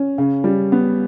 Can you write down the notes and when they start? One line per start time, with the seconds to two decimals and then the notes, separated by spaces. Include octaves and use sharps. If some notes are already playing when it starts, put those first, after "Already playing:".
Already playing: C#4
0.18 C#3
0.44 G3
0.72 B3